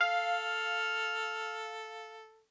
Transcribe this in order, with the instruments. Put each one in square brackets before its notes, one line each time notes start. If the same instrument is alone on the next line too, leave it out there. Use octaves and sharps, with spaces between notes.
[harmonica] A4 [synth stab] F5 [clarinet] F6